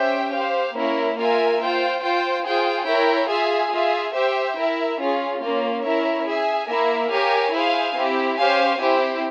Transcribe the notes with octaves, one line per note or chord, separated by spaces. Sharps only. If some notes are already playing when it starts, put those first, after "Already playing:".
Already playing: C#4 G4 C5 E5 G5
G4 C5 F5
A#3 C#4 E4 A#4 C#5
A#3 F4 A#4 E5 G#5
F4 C5 G5
F4 C5 G5
F4 G#4 C5 G5
E4 A#4 C#5 G5
F4 G#4 E5 G#5
F4 G#4 E5
G4 C5 E5 G5
E4 A#4 E5
C#4 F4 G#4
A#3 C#4 F4
C#4 E4 A#4 C#5 E5
G#4 E5 G#5
A#3 E4 A#4 E5
G4 A#4 C#5 F5 G#5
E4 G#4 C5 F5 G#5
C4 E4 G4
C#4 G4 C5 F5 G#5
C4 E4 G4 C5